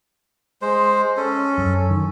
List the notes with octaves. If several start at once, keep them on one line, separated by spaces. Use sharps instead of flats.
G#3 C5
C#4 A4
F#2
D#3